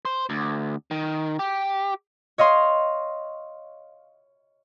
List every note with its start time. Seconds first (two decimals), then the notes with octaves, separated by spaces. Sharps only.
0.05 C5
0.30 D2
0.91 D#3
1.39 G4
2.38 C#5 D#5 F5 C6